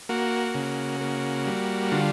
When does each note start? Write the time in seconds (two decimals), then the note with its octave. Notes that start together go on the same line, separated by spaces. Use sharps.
0.09 A#3 F#4
0.55 C#3
1.01 A#3
1.47 G3
1.92 D3 F4